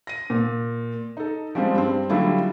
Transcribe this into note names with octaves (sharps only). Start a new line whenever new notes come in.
A#6 D#7
A#2
D#4 A4
F3 G3 G#3 C4
G2 C4
D3 F#3 G3 A3 E4 F4